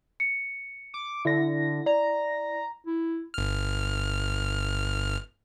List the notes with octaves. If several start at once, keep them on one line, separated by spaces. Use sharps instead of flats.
C#7
D6
D3 E4 A#6
D5 A#5
E4
G1 F6